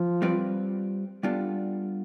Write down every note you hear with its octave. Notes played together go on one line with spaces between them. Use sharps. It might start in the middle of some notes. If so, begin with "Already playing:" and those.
Already playing: F3
G3 C4 F4 B4 D5
G3 B3 D4 F4 A4